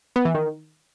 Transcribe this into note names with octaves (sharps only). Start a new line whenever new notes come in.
B3
E3
D#3